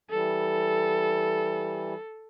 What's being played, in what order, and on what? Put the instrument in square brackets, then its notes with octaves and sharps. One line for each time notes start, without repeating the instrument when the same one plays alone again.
[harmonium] E3 G3 [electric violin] A4